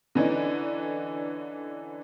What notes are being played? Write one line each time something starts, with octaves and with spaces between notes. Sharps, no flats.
D3 E3 C#4 D#4